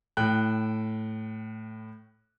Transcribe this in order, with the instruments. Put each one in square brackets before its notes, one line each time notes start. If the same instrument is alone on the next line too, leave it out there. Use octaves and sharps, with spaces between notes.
[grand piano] A2 G5 F#6